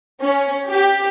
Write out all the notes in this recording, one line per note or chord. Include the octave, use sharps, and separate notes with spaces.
C#4
G4